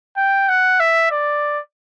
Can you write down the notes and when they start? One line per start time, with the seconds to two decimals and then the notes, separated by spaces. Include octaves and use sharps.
0.17 G5
0.49 F#5
0.80 E5
1.11 D5